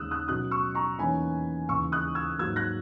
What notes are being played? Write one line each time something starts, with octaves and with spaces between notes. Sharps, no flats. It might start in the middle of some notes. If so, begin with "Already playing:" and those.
Already playing: D#2 C#3 G#3 D#6 E6 F#6
D#6 F#6
B2 F#3 C#4 D#6 F#6
C#6 E6
A#5 C#6
E2 D#3 A#3 C#4 G#5 B5
D#2 C#3 E3 C#6 E6
D#6 F#6
E6 G#6
G#2 F#3 A#3 E6 G#6
F#6 A#6